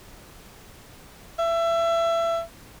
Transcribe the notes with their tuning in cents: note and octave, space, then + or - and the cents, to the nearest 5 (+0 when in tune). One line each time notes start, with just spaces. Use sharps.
E5 +25